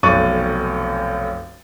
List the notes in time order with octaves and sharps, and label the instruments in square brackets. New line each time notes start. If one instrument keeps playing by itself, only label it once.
[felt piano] F1 B1 C#6 F#6 A6 D#7